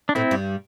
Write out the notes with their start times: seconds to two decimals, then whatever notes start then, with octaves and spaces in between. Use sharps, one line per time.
0.09 D4
0.15 A2 A3 C4 E4
0.31 G2 G3